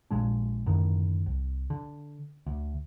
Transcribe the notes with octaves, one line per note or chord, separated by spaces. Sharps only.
A#1 A#2 G#3 D4
F#2 A2 D3 D#3
C2
D3
D2